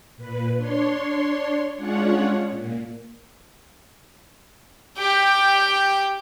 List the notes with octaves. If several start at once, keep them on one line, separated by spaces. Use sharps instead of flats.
A#2 B4
D4 C#5 C6
G#3 C#4 D4 F4 C#5 F#5
A#2
G4 G5